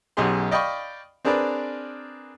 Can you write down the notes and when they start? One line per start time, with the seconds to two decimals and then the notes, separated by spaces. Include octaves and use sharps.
0.17 B1 F#2 B2 G4 G#4 C6
0.51 D5 D#5 F5 G5 B5 C#6
1.25 C4 D4 G#4 A#4 B4 D5